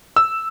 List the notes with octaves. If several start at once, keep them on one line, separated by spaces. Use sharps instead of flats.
E6